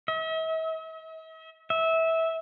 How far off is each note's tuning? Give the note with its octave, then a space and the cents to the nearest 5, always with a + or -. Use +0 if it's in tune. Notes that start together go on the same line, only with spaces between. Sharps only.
E5 -45
E5 -20